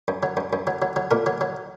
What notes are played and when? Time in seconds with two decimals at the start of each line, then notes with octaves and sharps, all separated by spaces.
0.08 F#2
0.23 F#3
0.37 F#2
0.53 F#2
0.67 F#3
0.82 F#3
0.96 F#3
1.11 A#2 A#4
1.26 F#3
1.41 F#3